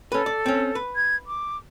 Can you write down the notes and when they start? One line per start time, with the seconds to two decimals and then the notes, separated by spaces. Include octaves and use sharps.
0.12 C#4 A4 B4
0.26 D5
0.46 C4 C#4
0.75 B4
0.96 G#6
1.27 D6